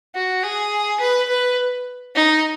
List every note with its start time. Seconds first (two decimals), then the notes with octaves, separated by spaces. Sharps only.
0.15 F#4
0.43 G#4
1.00 B4
1.29 B4
2.15 D#4